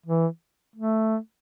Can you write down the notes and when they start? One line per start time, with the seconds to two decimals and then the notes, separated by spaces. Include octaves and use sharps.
0.06 E3
0.76 A3